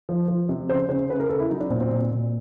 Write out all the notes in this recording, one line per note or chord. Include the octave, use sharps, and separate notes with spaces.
F3
F3
C3
C#3 C5
C#3 C5
C#3 B4
A#4
C#3 A4
E4
F#3 D#4
D4
A#2 C4
C4
A#2
A#2